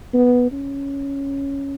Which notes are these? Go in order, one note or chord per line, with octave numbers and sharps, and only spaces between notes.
B3
C#4